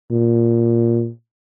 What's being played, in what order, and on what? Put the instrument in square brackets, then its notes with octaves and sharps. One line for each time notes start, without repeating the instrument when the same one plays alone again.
[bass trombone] A#2